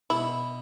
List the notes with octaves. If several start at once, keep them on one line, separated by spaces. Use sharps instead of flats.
B2 E4